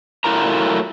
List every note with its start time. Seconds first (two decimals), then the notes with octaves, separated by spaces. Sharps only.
0.24 F#3 A3 E4 F4 A#4 A#5